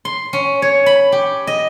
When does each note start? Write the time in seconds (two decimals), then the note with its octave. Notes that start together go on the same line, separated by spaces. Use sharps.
0.05 C6
0.33 C#4
0.62 C#5
0.86 B5
1.12 G4
1.47 D#5